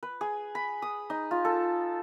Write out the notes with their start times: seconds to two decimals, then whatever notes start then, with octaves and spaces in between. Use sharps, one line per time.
0.03 B4
0.21 G#4
0.55 B5
0.82 D#6
1.10 D#4
1.31 F4
1.45 A4